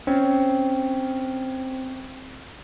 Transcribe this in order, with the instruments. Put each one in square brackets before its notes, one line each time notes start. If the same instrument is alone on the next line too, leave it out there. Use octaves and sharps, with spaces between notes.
[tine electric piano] C4 [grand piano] C#4